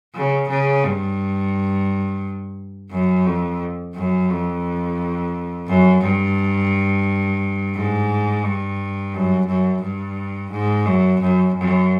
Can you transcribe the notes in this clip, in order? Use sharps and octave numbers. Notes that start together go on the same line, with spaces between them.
C#3
C#3
G2
F#2
F2
F#2
F2
F#2
G2
G#2
G2
F#2
F#2
G2
G#2
F#2
F#2
F#2